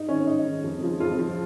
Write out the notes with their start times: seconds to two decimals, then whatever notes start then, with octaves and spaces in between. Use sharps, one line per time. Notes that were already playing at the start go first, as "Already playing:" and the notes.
Already playing: G#2 D#4
0.09 D#3 C#4
0.27 G#2 D#4
0.45 D#3
0.64 F2
0.83 C#3 F3
1.00 F2 F4
1.18 C#3 F3